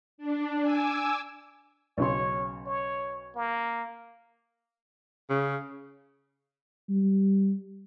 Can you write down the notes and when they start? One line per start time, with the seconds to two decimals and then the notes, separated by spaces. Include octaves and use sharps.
0.18 D4
0.60 G#5 D6 E6
1.98 B1 C#3 C#5 C6
2.67 C#5
3.35 A#3
5.30 C#3
6.90 G3